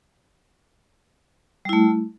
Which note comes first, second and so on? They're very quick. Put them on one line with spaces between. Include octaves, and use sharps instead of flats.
G3 E4 A3